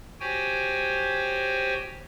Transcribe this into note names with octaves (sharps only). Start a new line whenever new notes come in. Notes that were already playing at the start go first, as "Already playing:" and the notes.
F#4 G4 C5 C#5 G5 G#5